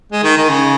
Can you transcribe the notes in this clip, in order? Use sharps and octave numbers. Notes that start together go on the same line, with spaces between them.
G#3
D#3
D#3
C#3